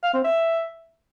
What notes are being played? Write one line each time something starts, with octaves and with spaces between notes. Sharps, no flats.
F5
C4
E5